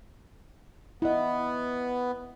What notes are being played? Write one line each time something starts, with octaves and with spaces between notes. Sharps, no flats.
B3 E4 D#5